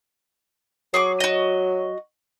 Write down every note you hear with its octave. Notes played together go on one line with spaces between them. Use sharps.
F#3 G#4 C#6 D6
F#4 D#5